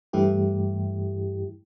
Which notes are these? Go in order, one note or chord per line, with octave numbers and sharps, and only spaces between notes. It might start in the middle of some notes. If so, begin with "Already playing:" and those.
G2 E3 A3 E4 G4